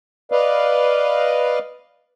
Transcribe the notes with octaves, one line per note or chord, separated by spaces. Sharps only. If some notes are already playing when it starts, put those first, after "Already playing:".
B4 D5 D#5 F5